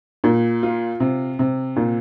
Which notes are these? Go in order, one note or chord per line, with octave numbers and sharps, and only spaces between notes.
A#2
F4
C3
C3
A#2